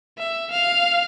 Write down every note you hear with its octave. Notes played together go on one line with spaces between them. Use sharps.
E5
F5